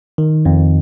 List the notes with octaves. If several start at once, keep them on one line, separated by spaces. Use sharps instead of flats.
D#3
F2